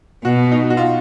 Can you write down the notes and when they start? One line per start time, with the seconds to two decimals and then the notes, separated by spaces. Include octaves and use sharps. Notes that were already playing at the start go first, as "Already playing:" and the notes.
0.25 B2 F#4
0.51 D#4
0.70 F#4
0.77 F4